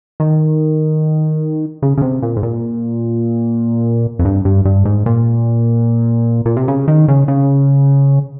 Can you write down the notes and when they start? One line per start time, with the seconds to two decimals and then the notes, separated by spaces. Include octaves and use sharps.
0.20 D#3
1.82 C#3
1.98 C#3
2.01 C3
2.23 A#2
2.36 G#2
2.43 A#2
4.19 F2
4.25 G2
4.45 G2
4.65 G2
4.85 G#2
5.06 A#2
6.45 A#2
6.57 C3
6.68 C#3
6.88 D#3
7.08 C#3
7.28 C#3